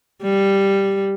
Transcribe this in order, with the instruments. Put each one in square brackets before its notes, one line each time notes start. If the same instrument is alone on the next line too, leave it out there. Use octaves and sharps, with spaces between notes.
[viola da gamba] G3